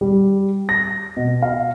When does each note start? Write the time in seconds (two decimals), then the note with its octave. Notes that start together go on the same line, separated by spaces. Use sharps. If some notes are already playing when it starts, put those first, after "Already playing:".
0.01 G3
0.69 A#6
1.17 B2
1.42 F5